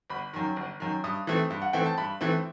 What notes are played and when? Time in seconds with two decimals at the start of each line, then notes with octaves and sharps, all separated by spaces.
0.10 G1 B5
0.33 F#2 D#3
0.56 G1
0.80 F#2 D#3
1.04 G2 D#6
1.27 E3 A3 C4
1.50 G2
1.62 F#5
1.73 E3 A3 C4 G5
1.86 A5
1.97 G2 B5
2.21 E3 A3 C4